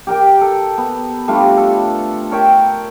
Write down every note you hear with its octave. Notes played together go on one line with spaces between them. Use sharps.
G4 A#4 G5
A4
B3
G3 A3 D4 F4
A4
A#4 C#5 E5 G5